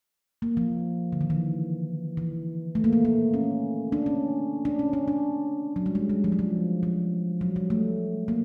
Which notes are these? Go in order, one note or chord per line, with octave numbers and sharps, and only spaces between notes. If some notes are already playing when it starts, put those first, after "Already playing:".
A#3
F3
D3
D#3
E3
E3
A3
A#3
A3
A#3
C#4
D4
C#4
D4
C#4
D4
D4
F#3
G3
G#3
G3
F3
F#3
F3
F3
F#3
G3
A3
A#3